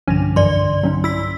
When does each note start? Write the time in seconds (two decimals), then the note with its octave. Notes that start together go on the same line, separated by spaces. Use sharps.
0.07 B1 G2 D3 F3 C#4 G#5
0.36 F#2 E3 D5 C6
0.83 F#3 C#4 D#4
1.04 E4 E6 B6